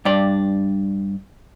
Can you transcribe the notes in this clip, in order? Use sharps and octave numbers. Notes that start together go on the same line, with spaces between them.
G2 D5